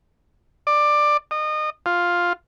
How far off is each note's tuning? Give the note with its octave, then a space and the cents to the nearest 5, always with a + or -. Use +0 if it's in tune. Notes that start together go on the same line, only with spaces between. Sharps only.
D5 +15
D#5 -30
F4 +5